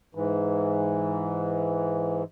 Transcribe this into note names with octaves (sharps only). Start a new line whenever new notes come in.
G#2 E3